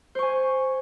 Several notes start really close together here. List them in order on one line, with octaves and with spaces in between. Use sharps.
C5 C#6 G#5